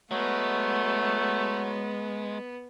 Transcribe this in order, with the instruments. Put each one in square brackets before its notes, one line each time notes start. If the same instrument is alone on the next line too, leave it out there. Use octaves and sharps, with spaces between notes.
[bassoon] F#3 [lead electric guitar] G#3 [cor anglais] A3 [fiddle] B3